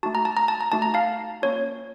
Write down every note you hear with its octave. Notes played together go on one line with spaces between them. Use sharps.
A3 D#4 F#4 A5
A#5
A5
A#5
A5
A#5
A3 D#4 F#4 A5
A#5
F5 A5
A#3 C#4 F4 C#5